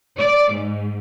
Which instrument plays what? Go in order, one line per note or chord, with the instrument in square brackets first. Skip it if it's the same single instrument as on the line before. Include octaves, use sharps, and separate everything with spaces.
[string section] D5
G#2